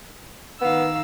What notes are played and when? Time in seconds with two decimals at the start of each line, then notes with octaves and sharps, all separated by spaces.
0.61 D#3 B3 F5 E6